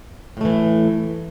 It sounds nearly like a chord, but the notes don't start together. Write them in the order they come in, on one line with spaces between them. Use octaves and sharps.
A2 A3 E3